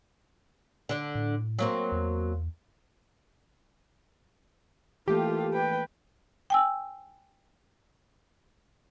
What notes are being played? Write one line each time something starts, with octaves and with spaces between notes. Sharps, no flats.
D3 D4
A2
F#3 A#3 C4
E2
E3 A3 A#3 F4 G4 A4
B4 G5
G5 G#5 E6